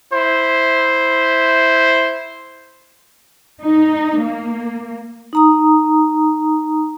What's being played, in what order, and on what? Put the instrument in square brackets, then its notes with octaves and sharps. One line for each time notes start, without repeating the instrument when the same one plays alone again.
[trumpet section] E4 C5
[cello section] D#4
A#3
[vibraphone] D#4 A#5 D#6